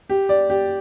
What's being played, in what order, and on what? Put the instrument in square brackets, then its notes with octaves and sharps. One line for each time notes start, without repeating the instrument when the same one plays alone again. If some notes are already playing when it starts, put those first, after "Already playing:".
[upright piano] G4
D5
G4